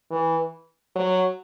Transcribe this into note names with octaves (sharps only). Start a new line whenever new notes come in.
E3
F#3